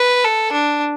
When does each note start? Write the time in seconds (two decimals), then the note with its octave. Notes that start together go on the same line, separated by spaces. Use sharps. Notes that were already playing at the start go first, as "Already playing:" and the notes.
Already playing: B4
0.24 A4
0.52 D4